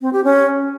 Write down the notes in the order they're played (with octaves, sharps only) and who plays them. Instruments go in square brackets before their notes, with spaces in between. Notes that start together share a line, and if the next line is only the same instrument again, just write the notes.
[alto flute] C4
G4
C#4